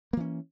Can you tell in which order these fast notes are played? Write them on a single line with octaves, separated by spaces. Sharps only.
A#3 E3 C#4